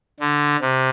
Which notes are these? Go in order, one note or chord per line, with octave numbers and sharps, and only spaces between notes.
D3
C3